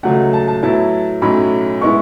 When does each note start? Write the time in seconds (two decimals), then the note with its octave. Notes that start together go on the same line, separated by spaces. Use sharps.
0.03 C#2 C#3 F#3 A3 F#5
0.33 A5
0.48 A5
0.63 A2 F#3 B3 E4 A5
1.22 B1 A2 F#3 C#4 B5
1.81 G#3 B3 E4 C#6